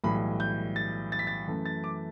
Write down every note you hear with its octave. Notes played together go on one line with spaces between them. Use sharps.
B1 A2 E3 G3 B5
G6
A6
A6
B6
A6
F#2 E3 A3
A6
D6